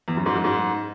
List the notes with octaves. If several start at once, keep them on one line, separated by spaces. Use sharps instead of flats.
E2
F#2
G#2
F#2
G#2